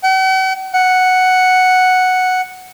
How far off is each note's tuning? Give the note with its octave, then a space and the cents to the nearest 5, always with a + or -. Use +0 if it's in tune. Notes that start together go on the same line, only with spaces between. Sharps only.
F#5 +45
F#5 +0